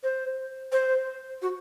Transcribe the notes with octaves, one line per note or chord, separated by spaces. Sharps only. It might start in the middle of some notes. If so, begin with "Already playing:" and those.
C5
C5
F#4